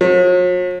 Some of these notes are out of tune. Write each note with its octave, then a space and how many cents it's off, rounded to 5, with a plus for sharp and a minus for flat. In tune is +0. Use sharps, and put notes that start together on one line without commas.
F#3 -45